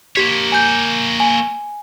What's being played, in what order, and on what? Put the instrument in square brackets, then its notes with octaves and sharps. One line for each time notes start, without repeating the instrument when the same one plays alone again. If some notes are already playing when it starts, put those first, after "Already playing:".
[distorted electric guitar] A#3 C#5 [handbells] G4 B6
[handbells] G#5 G6
G#5